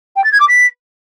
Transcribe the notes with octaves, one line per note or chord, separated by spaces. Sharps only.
G5
A6
G#6
D6
B6